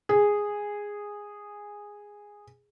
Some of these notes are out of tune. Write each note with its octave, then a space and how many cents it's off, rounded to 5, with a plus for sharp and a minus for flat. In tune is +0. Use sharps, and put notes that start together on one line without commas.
G#4 -10